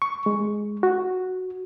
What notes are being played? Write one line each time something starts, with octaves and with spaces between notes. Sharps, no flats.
C#6
G#3
F#4